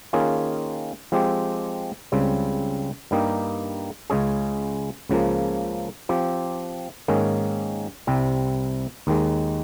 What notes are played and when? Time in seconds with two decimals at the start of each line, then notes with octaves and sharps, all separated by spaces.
0.13 D#3 A#3 C#4 F4 G#4
1.12 F3 G#3 C4 G4
2.12 C#2 C#3 G3 C4
3.11 G2 G3 A#3 D#4 G4
4.10 C#2 C#3 G#3 C#4 G#4
5.09 C#2 C#3 F3 A#3
6.09 F3 C4 G4
7.08 G#2 D#3 A#3 C#4 G#4
8.07 C2 C3 G3 C4
9.07 D#2 D#3 G#3